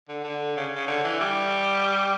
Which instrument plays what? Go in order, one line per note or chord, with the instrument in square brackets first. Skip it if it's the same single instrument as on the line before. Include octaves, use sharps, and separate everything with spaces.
[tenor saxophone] D3
D3
C#3
C#3
D3
E3
G3